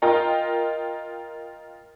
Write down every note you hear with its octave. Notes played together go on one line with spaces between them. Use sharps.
F4 A#4 D#5 G5 A#5